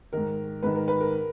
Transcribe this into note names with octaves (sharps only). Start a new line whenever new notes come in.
G#2 D#3 A#4
G#2 D#3 B4
A#4
B4
A#4